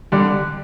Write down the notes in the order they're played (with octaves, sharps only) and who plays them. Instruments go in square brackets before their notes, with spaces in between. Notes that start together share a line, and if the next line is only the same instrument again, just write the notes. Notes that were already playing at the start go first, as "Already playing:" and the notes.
[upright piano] D3 G3 D5